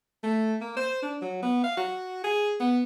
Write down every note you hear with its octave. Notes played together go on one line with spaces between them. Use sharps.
A3
A#3
C5
D4
F#3
B3
F5
F#4
G#4
B3